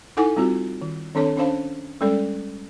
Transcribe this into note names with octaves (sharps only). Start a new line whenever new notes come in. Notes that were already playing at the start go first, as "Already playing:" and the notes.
D#4 E4 A4 F#5 G#5 D6
G3 C4 F4 F#4
D#3
D#3 C4 D4 A4 C#5 A5
C#4 D4 C5 F5 A5
G3 G#3 C#4 A4 D5